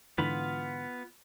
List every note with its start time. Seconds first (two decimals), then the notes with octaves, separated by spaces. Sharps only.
0.18 G#2 D3 E3 B3 F4 B5